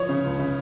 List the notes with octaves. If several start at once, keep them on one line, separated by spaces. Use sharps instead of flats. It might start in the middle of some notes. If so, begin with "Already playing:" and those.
Already playing: F3 C#5
C#3
C#2
C#3